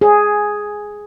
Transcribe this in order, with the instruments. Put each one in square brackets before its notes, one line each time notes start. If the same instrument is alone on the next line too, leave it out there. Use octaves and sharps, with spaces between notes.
[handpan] G#4